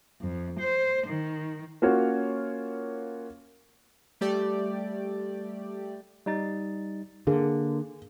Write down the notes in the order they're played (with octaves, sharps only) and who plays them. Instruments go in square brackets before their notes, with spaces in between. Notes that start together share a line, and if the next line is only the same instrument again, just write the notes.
[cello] F2
C5
D#3
[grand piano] A#3 C#4 F4 F#4 C#5
[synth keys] G3 A3 G4 D5
[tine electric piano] G3 D#4 A6
[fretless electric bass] D3 [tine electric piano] A#3 [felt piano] G#4